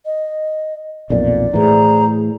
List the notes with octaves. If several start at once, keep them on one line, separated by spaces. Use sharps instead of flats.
D#5
B1 F2 A#2 D5
A2 E3 G#4 C5 A#5